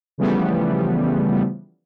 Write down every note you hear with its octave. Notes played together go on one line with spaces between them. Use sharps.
C#3 E3 F3 G3 A3 B3